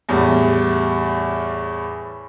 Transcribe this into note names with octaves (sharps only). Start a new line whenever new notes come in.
E2 A2 G3